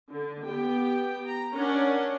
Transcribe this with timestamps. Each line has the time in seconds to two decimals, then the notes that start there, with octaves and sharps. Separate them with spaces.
0.11 D3
0.46 B3 G4 G5
1.26 A#5
1.55 C#4 D4 A#4 C#5 F#5